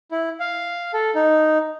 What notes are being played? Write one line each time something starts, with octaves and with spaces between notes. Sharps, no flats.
E4
F5
A4
D#4